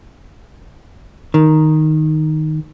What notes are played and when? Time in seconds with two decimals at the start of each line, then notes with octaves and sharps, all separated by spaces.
1.34 D#3